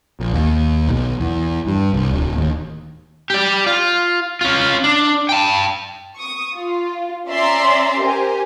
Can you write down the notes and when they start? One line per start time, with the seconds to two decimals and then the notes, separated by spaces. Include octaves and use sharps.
0.20 A#1
0.34 D#2
0.88 B1
1.20 E2
1.67 G2
1.93 C2
2.12 D1
2.36 D#2
3.30 G4 D5
3.66 F4
4.41 C#4 F4
4.84 D4
5.29 G5 A5
6.17 C#6 D#6
6.56 F4
7.29 C#4 D5 E5 A#5 C6
7.99 G4 A#4 C5 G#5